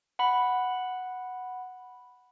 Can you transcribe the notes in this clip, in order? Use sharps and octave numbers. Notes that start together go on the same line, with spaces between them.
F#5 B5